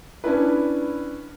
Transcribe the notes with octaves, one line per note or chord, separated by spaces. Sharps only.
C#4 D4 E4 B4